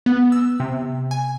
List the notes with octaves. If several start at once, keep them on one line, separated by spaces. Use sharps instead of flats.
B3
E6
C3
G#5